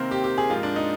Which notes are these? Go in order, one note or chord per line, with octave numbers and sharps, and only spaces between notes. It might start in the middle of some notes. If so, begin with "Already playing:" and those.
Already playing: C3 D#3 A#3 C4
G4
G4
G#4
G#2 F3 A#3 F4
D4
D#4